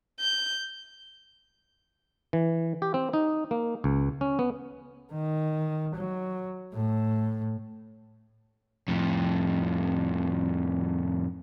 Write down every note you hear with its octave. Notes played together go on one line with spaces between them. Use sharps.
G6
E3
G4
C4
D#4
A#3
C#2
C#4
B3
D#3
F#3
A2
F2 A2